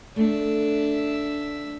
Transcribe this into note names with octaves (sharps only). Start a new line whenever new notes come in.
A3 D4 E5